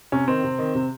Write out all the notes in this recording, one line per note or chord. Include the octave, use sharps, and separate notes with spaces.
C3 C#4
D#3 C4
C3
D#3
C3